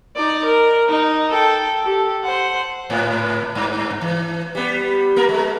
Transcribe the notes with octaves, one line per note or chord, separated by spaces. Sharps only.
D#4 D5
A#4
D#4
A4 G5
G4 A4
C5 F#5
G#2
G2
E3
G3 B3
A#3 A#4
G#3